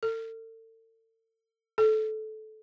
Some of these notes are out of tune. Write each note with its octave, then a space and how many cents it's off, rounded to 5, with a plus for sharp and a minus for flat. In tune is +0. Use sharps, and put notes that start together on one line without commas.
A4 +40
A4 -20